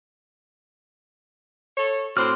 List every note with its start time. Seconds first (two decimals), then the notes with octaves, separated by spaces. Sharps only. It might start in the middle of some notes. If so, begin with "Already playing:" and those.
1.77 A4 C#5
2.17 A2 C4 F#4 C6 D6 F6